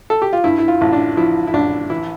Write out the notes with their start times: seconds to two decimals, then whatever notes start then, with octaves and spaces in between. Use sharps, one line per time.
0.10 A4
0.22 G4
0.33 F4
0.44 G2 E4
0.58 E4
0.68 F4
0.81 A1
0.93 D4
1.17 F3 E4
1.47 E4
1.53 A1 D4
1.90 E3 E4